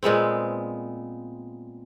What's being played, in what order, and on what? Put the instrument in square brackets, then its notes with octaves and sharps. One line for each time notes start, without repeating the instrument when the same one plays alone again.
[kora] A#2 G#3 B3 C4